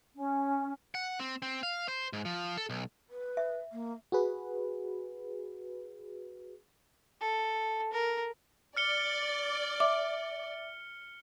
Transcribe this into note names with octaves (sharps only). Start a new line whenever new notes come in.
C#4
F#5
C4
C4
F5
C5
G#2
F3
A4
B1
B4
E5
A#3
F#4 G#4 B4
A4
A#4
D5 F6 C#7 G7
E5 D6